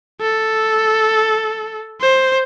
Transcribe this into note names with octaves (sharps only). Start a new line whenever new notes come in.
A4
C5